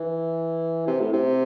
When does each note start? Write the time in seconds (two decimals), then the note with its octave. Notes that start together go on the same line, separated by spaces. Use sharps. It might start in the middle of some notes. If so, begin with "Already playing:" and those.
Already playing: E3
0.87 C3
1.01 A2
1.13 C3